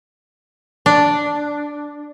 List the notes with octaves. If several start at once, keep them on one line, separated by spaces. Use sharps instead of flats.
D4